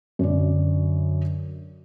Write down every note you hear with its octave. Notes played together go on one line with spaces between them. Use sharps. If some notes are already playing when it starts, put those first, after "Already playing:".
F#2 D3 D5